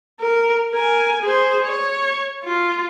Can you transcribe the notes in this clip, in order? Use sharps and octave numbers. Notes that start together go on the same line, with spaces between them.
A#4
A#4 G#5
G#4 C5
C#5
F4